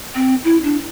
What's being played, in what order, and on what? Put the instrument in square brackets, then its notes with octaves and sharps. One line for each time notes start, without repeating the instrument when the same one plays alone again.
[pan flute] C4
E4
D4